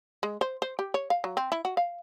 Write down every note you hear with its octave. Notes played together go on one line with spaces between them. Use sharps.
G#3
C5
C5
G4
C#5
F5
F#3
C4
E4
F#4
F5